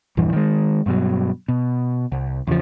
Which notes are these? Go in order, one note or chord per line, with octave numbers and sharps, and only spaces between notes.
A#1 E2 G2 E3
D#3 G#3
G2 B2 F#3
B2
C2
E2 C#3 F3